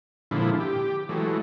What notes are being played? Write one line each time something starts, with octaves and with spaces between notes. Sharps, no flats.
A#2 D3 F3 G#3 E4
G4
E3 F#3 G#3 A3